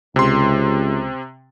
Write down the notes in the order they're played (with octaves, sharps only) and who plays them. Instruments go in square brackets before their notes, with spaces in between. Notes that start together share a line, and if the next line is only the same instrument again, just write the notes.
[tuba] C#2 [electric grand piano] C3 C6